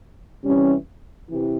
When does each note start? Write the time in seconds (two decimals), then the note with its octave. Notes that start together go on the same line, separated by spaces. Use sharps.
0.44 C3 E3 G3 C#4
1.29 C3 E3